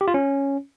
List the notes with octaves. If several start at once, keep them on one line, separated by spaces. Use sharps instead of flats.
G4
F4
C#4